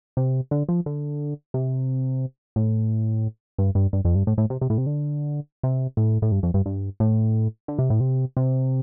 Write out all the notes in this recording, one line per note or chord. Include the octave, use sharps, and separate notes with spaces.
C3
D3
F3
D3
C3
A2
G2
G2
G2
F2
G2
A2
A2
C3
C3
A2
C3
D3
C3
A2
A2
G2
F2
G2
G2
A2
D3
C3
A2
C3
C3